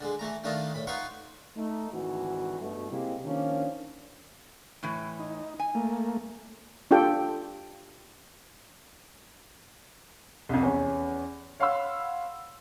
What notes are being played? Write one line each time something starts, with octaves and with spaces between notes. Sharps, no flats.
D3 G#3
E3 A3 A#5
D#3 A3 D4 F4 D#5
A2 B5
D#4 F4 B4 F#5 C6 C#6
A3 D#4
G#1 D2 E3 F#4
G2 B2 A3
C3 G#3 A#3 E4 G4
D#3 F3 A#3 C#4 D4
A2 E3 A3
D#4
G#5
A3 A#3
D4 F4 G4 A4 G5
C2 F2
E2 C#4
C#5 F5 F#5 B5 C6 E6